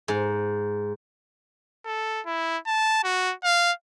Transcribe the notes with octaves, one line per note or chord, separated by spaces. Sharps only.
G#2
A4
E4
A5
F#4
F5